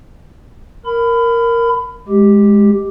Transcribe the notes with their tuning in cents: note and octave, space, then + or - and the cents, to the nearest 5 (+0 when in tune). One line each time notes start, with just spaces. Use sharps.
A#4 +0 B5 +25
G#3 +0 G4 +0